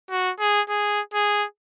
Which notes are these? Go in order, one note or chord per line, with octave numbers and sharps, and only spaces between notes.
F#4
G#4
G#4
G#4